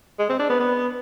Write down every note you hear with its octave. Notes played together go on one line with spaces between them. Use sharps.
G#3
C4
D4
B3
B3